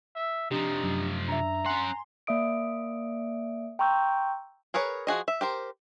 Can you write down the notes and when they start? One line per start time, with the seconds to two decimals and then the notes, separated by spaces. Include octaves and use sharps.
0.15 E5
0.51 C3 F3 D4 D#4 G4
0.84 F#2
1.29 D4 E5 A#5
1.66 C#4 F#5 G#5 C6
2.27 A#3 D5 E5 D#6 D7
3.79 G5 A#5 C6 C#6 E6 G6
4.74 G#4 A#4 B4 C#5
5.07 F3 F#4 G#4 D#5
5.28 E5
5.41 G4 A#4 C5